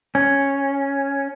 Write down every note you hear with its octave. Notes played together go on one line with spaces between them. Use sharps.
C#4